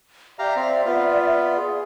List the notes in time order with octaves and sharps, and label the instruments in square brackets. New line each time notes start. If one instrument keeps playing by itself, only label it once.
[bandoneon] G4 F5 A#5 [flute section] D5 E5
[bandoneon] C4 F5
B3 F4
[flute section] G#4